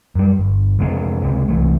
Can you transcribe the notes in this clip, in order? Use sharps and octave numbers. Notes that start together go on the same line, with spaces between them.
F#2 G3
G1
F1 F2 B2 G#3
C#2 C3 G#3
C2 E3 A3